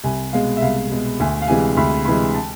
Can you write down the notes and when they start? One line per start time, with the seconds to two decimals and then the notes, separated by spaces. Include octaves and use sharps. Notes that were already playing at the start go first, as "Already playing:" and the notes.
0.04 C2 G#5
0.33 B2 G#3 F5
0.57 E5
0.62 C2 F5
0.91 B2 G#3
1.20 D2 G#5
1.42 F5
1.48 C3 E3 G#3 G#5
1.77 D2 B5
2.05 C3 E3 G#3 B5
2.34 A5